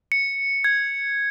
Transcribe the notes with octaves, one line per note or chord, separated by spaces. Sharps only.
C#7
G#6